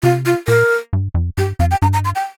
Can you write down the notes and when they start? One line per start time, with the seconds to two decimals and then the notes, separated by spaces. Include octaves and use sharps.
0.03 C3 F4
0.26 F4
0.48 A#2 A#4
0.93 G2
1.14 F2
1.38 G2 G4
1.59 F2 F5
1.71 G5
1.82 G2 A#5
1.93 A#5
2.05 C6
2.15 G5